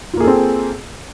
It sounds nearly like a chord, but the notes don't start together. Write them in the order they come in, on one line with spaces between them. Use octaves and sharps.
F4 A#3 G#4 A4 C4